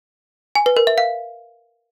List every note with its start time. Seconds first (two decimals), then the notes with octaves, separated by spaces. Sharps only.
0.55 G#5
0.66 B4
0.77 A#4
0.87 E5
0.98 F5